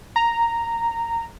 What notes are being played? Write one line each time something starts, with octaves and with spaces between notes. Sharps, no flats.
A#5